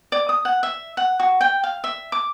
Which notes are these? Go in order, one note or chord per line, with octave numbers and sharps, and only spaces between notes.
D5
D#6
F#5
E5
F#5
F#4
G5
F5
E5
D6